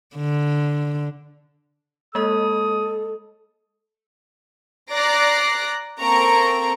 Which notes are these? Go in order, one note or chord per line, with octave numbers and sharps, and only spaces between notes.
D3
G#3 A#3 A4 D#5 D#6
D5 A#5 F#6 A#6 C7 D7
A#3 C4 A4 A#5 C#6 D7